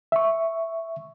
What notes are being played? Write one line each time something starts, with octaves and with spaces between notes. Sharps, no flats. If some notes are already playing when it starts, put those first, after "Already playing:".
E5 C#6